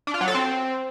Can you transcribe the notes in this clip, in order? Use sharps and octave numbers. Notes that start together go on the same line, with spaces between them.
D4
F4
F#3
A4
C4